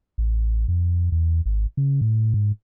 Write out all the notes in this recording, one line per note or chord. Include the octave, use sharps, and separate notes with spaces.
A1
F2
E2
G#1
C#3
A2
G#2